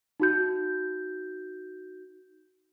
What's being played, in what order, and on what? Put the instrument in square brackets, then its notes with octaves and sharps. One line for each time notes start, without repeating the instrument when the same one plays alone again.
[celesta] D#4 F#4 G6